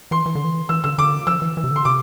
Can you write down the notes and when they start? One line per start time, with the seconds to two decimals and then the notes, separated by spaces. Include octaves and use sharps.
0.11 E3 C6
0.26 E3
0.35 D3
0.44 E3
0.69 E3 E6
0.84 D3 E6
0.98 D3 D6
1.27 F3 E6
1.42 E3
1.57 E3
1.64 C3
1.71 D3 C6
1.85 C3 D6